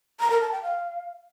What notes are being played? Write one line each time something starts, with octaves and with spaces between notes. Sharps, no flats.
A#5
A#4
A5
G5
F5